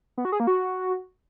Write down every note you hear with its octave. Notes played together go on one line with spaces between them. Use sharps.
B3
F#4
G#4
A#3
F#4